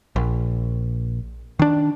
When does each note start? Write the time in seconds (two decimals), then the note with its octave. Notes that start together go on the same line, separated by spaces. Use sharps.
0.16 A#1
1.59 D#3 D4